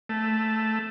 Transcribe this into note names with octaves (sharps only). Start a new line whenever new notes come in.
A3